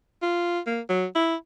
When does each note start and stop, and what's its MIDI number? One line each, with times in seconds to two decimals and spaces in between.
0.22 0.59 65
0.66 0.80 58
0.89 1.05 54
1.15 1.35 64